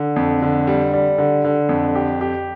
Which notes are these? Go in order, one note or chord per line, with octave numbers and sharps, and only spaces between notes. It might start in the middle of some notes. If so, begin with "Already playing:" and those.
Already playing: D3
F2
D3
G3
G3
D3
D3
F2
G4
G4